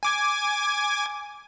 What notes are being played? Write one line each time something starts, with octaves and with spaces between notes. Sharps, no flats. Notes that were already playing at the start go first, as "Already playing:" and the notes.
G#5 D6 G#6